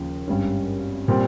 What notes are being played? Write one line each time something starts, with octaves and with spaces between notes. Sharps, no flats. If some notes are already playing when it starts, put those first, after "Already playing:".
Already playing: D#2 C#3 F3
G#1 G2 G3 C#4
A#2 G3 C4